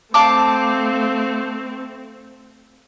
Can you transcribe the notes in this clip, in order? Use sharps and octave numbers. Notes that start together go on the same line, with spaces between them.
A3 C4 F5 A5 D6